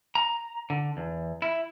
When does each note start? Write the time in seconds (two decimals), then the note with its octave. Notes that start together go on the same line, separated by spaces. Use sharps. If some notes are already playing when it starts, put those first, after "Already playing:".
0.15 A#5
0.70 D3
0.97 E2
1.42 E4